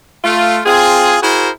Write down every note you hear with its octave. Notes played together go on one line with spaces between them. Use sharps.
A3 F4
C4 F4 G#4
E4 F#4 G#4 A#4 C5